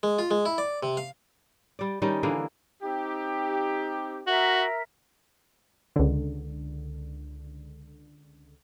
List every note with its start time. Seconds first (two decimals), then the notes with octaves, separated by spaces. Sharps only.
0.03 G#3
0.19 F4
0.31 G#3
0.46 E4
0.58 D5
0.83 C3
0.97 F5
1.79 G3 D5
2.02 D#3 G3 C#4 D#4
2.23 D3 E3 A#3 G#4
2.82 C4 D#4 G4
4.27 F#4 A#4 E5
5.96 C#2 D3